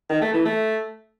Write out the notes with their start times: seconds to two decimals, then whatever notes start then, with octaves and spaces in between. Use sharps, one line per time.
0.10 D#3
0.21 A3
0.33 E3
0.45 A3